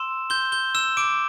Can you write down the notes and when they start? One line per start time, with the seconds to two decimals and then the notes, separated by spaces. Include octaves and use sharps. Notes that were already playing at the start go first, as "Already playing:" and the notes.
Already playing: C6 E6 E7
0.30 C6 G6 G7
0.52 G6 G7
0.75 E6 G6 E7
0.97 D6 D7